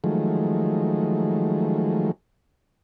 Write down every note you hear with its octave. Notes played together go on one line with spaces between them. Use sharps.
D#3 F3 F#3 G#3 A3